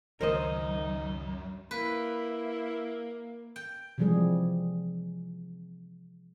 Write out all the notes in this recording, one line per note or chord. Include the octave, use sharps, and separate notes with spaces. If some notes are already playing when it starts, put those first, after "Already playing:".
C#2 F#2 D#3 D#4 A#4 C5 D#5
A#3 E4 B4
G5
C3 E3 F3 G3 G#3 G#4